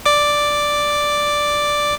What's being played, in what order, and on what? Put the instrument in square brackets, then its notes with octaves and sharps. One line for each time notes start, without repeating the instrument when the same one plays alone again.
[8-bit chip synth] D5 D6